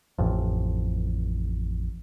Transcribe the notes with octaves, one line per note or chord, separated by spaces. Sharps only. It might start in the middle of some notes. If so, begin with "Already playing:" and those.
A1 F2